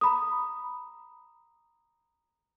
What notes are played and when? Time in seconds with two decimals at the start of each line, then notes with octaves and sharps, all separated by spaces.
0.01 A#5 B5 D#6